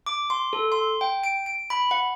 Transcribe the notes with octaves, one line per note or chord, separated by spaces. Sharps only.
D6
C6
A4
C6
G5
D7
D7
B5
F#5